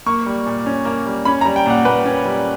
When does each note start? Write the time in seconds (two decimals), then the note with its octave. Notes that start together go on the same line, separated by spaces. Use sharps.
0.06 A#3 C#6
0.26 G3
0.46 A#2
0.66 C#4
0.85 A#3
1.06 G3
1.25 C#4 B5
1.41 A#5
1.45 G3
1.56 G5
1.66 A#2 F#5
1.85 A#2 B4
2.05 C#4
2.25 G3